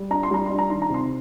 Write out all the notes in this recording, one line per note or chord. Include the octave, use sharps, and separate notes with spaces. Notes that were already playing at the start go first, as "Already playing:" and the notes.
Already playing: G3
D4 A#5
C6
G3 A#5
D4 C6
A#5
D#3 C6
A#5
C3 C6